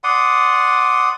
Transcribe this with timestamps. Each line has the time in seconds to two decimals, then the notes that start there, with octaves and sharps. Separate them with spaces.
0.04 D5 F#5 C6 D#6